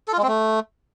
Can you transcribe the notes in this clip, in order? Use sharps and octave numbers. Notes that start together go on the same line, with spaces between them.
A4
F4
G#3
C4
A3